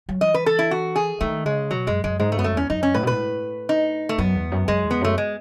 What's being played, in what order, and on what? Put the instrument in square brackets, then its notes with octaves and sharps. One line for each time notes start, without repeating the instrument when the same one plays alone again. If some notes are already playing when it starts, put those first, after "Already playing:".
[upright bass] F#3
[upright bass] E3 [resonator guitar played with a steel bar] D#5
[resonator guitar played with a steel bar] B4
A4
E4
F#4
G#4
[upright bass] D#3 [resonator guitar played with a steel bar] A3
[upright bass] C#3 [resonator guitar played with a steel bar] G#3
[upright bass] B2 [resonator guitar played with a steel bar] F#3
[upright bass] F#2 [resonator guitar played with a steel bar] G#3
[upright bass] F#2 [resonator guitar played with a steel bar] G#3
[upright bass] G#2 [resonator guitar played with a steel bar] G#3
[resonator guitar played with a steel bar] A3
[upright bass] F#2 [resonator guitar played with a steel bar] B3
[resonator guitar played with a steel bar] A3
[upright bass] E2 [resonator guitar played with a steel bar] C#4
[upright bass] F#2 [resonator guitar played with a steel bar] D#4
[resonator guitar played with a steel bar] C#4
[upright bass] A2 [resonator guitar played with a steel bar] B4
[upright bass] B2
[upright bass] A2 [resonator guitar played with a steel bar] B4
[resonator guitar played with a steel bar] D#4
A3
[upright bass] F#2 [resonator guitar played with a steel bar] B3
[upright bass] E2
F#2
[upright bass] F#2 [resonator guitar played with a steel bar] G#3
[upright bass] E2
[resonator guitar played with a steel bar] B3
[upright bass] F#2 [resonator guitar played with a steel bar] A3
[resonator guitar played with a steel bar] G#3